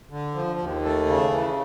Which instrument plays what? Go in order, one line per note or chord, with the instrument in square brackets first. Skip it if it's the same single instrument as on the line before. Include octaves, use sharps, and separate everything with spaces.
[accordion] D3
F3
D#2
A3
C#3
E3